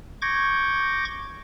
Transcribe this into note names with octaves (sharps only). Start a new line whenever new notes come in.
C#6 D6 G6 G#6 A#6